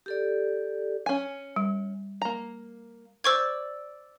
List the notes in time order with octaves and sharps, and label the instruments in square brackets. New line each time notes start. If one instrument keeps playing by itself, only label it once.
[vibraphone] G4 A4 D5
[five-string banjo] C#4 G#5
[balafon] G3
[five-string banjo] A#3 A#5
[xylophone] C5 C#6 G#6 [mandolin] D5 E6